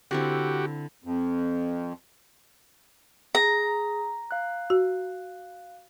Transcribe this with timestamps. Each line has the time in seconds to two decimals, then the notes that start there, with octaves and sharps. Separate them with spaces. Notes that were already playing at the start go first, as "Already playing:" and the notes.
0.11 D3 C4 E4 F#4 G4
1.04 F2
3.35 G#4 A#5
4.31 F5 F#6
4.70 F#4